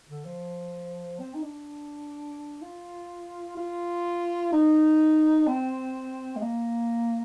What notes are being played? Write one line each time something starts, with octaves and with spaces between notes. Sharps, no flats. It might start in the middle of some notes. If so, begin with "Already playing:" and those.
D3
F3
C4
D#4
D4
F4
F4
D#4
C4
G#3
A#3